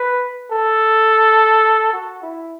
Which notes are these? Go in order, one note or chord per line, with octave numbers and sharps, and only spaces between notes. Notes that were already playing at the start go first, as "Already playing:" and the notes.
Already playing: B4
A4
F#4
E4